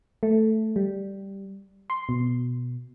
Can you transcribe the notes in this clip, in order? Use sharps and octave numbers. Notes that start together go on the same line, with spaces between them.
A3
G3
C6
B2